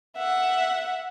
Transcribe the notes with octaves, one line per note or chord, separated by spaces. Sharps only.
E5 F#5